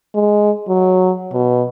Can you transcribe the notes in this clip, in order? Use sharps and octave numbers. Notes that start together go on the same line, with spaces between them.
G#3
F#3
B2